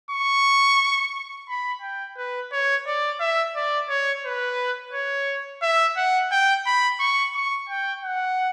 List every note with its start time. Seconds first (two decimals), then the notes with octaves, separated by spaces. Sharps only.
0.11 C#6
1.49 B5
1.82 G5
2.17 B4
2.52 C#5
2.87 D5
3.20 E5
3.56 D5
3.89 C#5
4.25 B4
4.93 C#5
5.62 E5
5.97 F#5
6.31 G5
6.66 B5
7.00 C#6
7.35 C#6
7.69 G5
8.04 F#5